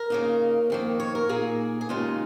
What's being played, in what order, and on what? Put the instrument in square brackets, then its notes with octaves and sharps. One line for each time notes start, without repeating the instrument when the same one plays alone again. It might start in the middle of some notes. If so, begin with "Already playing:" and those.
Already playing: [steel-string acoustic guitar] A#4
C#3 A#3 D#4
F2 D#3 A#3
C#5
A#4
A#2 A#3 D#4 G#4
G#4
D#2 C#3 G#3 D#4 F4